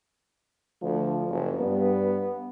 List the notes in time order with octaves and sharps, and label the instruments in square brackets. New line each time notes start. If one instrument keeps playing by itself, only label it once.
[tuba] D2 [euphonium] F3
[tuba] F#1
[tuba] G2 [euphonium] B3